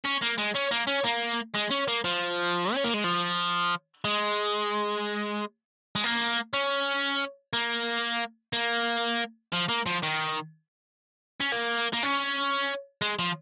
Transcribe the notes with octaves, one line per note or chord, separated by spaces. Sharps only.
C#4
A#3
G#3
C#4
A#3
C#4
A#3
G#3
C#4
A#3
F3
C#4
A#3
G#3
F3
G#3
G#3
A#3
C#4
A#3
A#3
F3
A#3
F3
D#3
C#4
A#3
A#3
C#4
G#3
F3